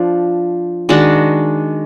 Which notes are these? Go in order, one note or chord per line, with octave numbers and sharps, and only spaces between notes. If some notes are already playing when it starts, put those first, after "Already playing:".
Already playing: F3 D4
D#3 G#3 D4 F#4